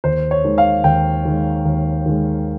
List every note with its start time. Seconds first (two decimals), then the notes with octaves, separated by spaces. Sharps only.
0.04 D#2 C5
0.31 C#5
0.44 D#3 G#3
0.58 F5
0.84 D#2 G5
1.25 D#3 G#3
1.65 D#2
2.06 D#3 G#3